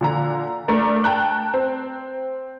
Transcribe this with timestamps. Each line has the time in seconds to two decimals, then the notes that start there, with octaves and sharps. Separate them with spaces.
0.01 A#2 D3 A#5
0.68 A3 D4 A#4 D5
1.04 G5 A5 A#5 F#6
1.54 C4